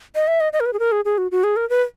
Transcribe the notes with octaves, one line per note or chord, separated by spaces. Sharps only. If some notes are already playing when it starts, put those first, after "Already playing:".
D#5
E5
D#5
D#5
A#4
B4
G#4
A#4
G#4
G#4
F#4
F#4
G#4
A#4
B4